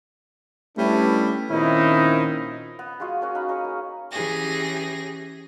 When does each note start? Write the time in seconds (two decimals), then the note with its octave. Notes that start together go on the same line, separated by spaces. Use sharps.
0.77 G3 A3 B3 C#4 D4 E4
1.50 A#2 D#3 C4 C#4 D#4 E4
2.79 B3
3.00 G#3 F4 F#4 G#4
3.21 A#3 C#4 F#4
3.35 D#4 F5 A#5 B5
3.49 D#4 G#4 C#5
3.65 A#3
4.12 E3 C#4 G4 G#4 A#6